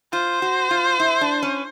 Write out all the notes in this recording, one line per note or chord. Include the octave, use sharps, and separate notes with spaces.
F4 C5
F#4
F4
E4
D4
C#4